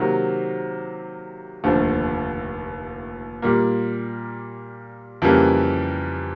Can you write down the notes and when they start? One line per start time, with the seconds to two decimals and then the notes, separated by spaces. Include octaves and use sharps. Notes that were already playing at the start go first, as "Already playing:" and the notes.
Already playing: C3 D#3 F#3 A#3
1.64 F1 D#2 D3 F3 A3
3.42 A#2 G3 A#3
5.22 F2 C#3 E3 G3 A#3